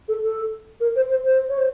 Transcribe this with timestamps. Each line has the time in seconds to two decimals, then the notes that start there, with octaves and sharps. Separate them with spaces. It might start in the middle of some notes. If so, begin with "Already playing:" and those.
0.08 A4
0.23 A4
0.80 A#4
0.96 C5
1.10 C5
1.24 C5
1.49 C#5
1.58 C5